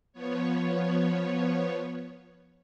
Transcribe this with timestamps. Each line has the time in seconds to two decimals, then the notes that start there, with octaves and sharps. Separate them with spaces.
0.13 F3 B3 C#5